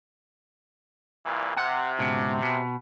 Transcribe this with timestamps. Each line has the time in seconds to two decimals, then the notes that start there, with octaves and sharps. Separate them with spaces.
1.26 C2 A#2 E3
1.57 C3 F#5
1.99 C#2 G#2 B2
2.42 B2